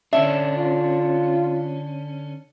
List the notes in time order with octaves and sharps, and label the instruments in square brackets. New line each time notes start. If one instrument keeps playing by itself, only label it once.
[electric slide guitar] D3 C#4 D4 [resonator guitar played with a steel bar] E5
[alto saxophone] F4